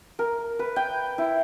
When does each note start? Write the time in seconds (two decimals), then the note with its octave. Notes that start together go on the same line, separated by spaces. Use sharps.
0.19 A#4
0.59 B4
0.76 G5
1.18 E4